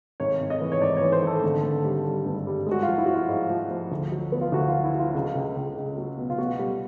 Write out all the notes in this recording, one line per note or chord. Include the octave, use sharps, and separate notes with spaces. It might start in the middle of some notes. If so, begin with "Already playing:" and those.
G#1 C#5
G#1
D#5
E3
C#5
G#2 D5
C#5
E3
C5
G#1 A4
D3
D3
G3
G3
G2
G3
G#3
F#4
F4
F3
E4
F3 F#4
F4
G#2
F3
F3
D2
F#3
B3
F4
D2 F#4
F4
F#3
E4
F#3 F4
C#2
C#2
C#2
C#2
F#3
B2
F4
B2 F#4
G3